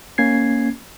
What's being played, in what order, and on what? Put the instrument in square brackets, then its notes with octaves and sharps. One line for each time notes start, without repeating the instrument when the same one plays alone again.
[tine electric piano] A#3 C#4 G#6 C7